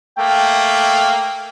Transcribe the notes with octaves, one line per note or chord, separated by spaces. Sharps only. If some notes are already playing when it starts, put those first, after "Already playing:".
A3 A#3 G5